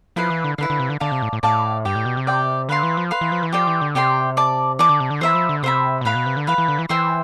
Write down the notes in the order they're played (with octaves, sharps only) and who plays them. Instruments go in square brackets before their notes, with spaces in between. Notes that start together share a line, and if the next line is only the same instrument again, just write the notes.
[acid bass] F3 [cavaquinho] E4 B4 F5
[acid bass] E3
D3
[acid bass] D3 [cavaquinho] E4 B4 F5
[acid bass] D3
C3
D3
[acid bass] D3 [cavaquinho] D5 F5 A5
[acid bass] C3
A2
A2
[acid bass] A2 [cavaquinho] D5 F5 A5
[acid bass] G2 [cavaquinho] G4 D5 G5
[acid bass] A2
B2
C3
[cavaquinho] G4 D5 G5
[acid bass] D3 [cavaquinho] B4 F5 C6
[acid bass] E3
F3
[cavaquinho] B4 F5 C6
[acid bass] E3
F3
E3
[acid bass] F3 [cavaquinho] G4 D5 G5 C6
[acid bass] E3
D3
[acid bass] C3 [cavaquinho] G4 D5 G5 C6
[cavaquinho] D5 A5 D6
[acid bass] E3 [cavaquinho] D5 A5 D6
[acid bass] D3
C3
D3
[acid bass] E3 [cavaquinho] C5 E5 B5
[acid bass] F3
D3
[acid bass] C3 [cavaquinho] C5 E5 B5
[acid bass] B2
[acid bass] A2 [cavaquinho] B4 F5 B5
[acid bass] B2
C3
D3
[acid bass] E3 [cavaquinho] B4 F5 B5
[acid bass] E3
D3
E3
[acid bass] E3 [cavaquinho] C5 E5 G5 C6